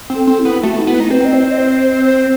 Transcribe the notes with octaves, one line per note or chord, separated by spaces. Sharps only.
C4
A4
C4
E4
B3
A3 F#4
D#4
B3 E4
D#4
C4 B4
D#5
C5
D#5
C5
C5
C5